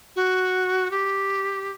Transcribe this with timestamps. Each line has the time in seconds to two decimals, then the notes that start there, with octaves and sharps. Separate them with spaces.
0.16 F#4
0.91 G4